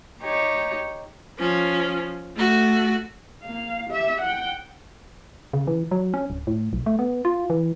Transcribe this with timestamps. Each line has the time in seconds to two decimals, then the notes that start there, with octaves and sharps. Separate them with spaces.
0.23 D#4 G4 C#5
1.38 F3 C#4
2.36 A3 F#4
3.43 A#3 F5
3.90 G4 E5
4.21 F#5 G5
5.53 C#3
5.67 E3
5.91 F#3
6.14 C#4
6.30 D1
6.47 A2
6.73 B1
6.86 A3
6.99 B3
7.25 F4
7.50 E3